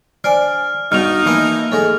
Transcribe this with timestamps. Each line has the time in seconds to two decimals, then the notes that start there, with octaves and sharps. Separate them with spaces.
0.24 D4 C5 D5 G#5 F6
0.92 G2 B2 D#4 F6 F7
1.26 E3 A3 A#3 E4
1.72 G#2 G#3 A4